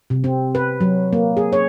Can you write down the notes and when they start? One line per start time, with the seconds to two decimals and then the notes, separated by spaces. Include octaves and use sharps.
0.10 C3
0.24 C4
0.55 B4
0.81 F#3
1.13 A#3
1.37 G#4
1.53 C#5